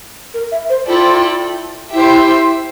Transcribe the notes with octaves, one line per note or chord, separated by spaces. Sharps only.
A#4
E5
C5
E4 F4 A4 D5 G5
E4 G4 C5 E5 G5